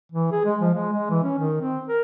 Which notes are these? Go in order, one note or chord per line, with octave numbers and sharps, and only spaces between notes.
E3
G#4
G#3
F3
G#3
G#3
E3
C#4
D#3
C4
A#4